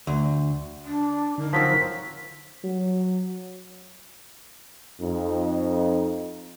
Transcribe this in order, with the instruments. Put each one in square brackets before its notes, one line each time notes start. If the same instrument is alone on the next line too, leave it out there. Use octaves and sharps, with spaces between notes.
[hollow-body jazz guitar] D2
[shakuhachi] D4
[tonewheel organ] D3 D#4 [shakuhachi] A#4
[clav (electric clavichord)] F3 F#3 C4 [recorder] B6
[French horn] F#3
[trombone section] F2 D#4